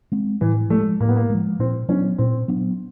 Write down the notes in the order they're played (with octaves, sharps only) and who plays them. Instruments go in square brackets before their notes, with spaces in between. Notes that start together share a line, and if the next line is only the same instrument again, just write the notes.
[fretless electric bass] G#3 C4
[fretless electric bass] A2 [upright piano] E3
[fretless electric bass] F3 [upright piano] A3
[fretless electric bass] G#3
[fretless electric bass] A2 [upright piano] A#3
[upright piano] B3
A#3
[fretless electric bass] F3 G#3
[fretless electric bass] A#2 [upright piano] C4
[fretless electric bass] F#3 B3 D4 [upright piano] C#4
[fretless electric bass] A#2 [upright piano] C4
[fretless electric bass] F#3 B3 D4